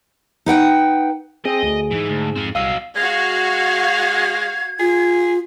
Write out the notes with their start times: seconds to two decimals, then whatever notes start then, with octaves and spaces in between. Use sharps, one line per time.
0.46 D#4 B4 F#5 G5
1.45 C4 G#4 D#5
1.63 D2
1.92 G#2 E3
2.09 D2
2.36 C4 F4
2.55 C2 F#3 D#5 F5 E6 C7
2.96 G#3 F#4 F5 G#6
4.79 F4 G#4